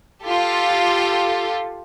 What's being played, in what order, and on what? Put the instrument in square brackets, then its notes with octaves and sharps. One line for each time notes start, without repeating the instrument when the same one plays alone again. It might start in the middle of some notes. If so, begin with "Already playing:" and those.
[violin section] F4 G4 A4